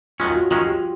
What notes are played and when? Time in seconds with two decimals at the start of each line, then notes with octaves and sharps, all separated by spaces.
0.20 F#2 D#3 G#3 C#4 F4
0.30 F4
0.36 F#4
0.51 F#2 D#3 G#3 C#4 F4
0.67 G4